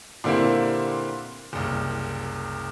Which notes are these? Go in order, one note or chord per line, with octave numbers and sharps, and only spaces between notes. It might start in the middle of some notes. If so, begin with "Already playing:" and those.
A#2 D3 A#3 C4 E4 G4
F#1 C2